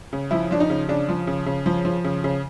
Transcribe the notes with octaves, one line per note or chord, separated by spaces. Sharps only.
C#3
F3 E4
F3 D4
D#4
C#3
C#3 D4
F3
C#3
C#3
F3
F3
C#3
C#3